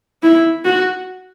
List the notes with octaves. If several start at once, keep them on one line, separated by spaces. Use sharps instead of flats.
E4
F#4